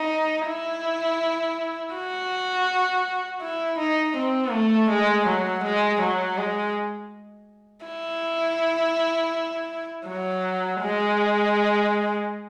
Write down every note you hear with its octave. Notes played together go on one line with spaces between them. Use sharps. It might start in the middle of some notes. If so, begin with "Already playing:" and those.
Already playing: D#4
E4
F#4
E4
D#4
C4
A3
G#3
F#3
G#3
F#3
G#3
E4
F#3
G#3